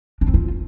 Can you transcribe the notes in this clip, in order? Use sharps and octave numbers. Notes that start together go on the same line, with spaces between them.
D4
C4
F4